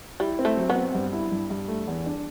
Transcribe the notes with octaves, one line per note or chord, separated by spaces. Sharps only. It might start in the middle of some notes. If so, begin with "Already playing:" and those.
G3 E4
C4
A3
F#3
B3
C4
G2
E4
G2
G2
A3
E2
D4